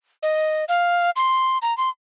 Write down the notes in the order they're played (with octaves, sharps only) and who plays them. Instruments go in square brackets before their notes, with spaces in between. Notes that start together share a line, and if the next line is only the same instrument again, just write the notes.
[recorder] D#5
F5
C6
A#5
C6